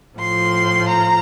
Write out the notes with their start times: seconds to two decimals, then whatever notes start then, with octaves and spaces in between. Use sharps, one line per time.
0.19 A2 F3 C6
0.88 A#5